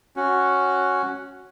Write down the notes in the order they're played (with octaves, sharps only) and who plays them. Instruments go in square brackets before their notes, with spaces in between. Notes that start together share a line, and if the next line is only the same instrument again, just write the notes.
[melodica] C#4 F#4